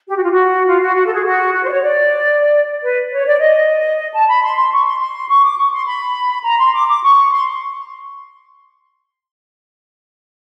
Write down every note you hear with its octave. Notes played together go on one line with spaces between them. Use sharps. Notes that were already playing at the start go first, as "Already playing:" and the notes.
G4
F#4
F4
F#4
F4
F#4
F#4
A4
G#4
F#4
F#4
C5
D5
C#5
D5
B4
C#5
D5
D#5
A5
B5
C6
C6
C#6
C6
C6
C#6
D6
C#6
C6
B5
A#5
C6
D6
D6
C#6
C6